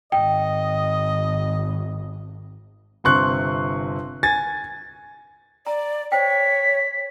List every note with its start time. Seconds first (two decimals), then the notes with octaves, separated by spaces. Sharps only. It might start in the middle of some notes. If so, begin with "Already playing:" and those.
0.12 G#1 D#5 G5
3.04 G1 C3 C6 C#6 F#6
4.23 G#5 G#6 A6
5.66 D5 A#5
6.12 C5 C#5 G5 B6